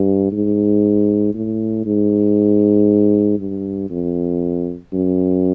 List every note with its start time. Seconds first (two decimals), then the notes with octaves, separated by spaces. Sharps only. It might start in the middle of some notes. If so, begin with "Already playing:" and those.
Already playing: G2
0.32 G#2
1.34 A2
1.85 G#2
3.38 G2
3.90 F2
4.93 F#2